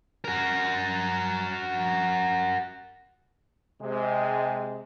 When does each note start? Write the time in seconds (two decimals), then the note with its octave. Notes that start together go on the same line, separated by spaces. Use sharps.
0.24 F#4 A#4
3.82 C3 G#3